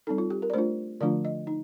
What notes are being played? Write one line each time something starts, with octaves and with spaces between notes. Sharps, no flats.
G3 C4 D#4 A4
F4
G4
A#4
D5
A3 D4 F4 C5
D3 F3 A3 D4 F4 D5
D#5
D#4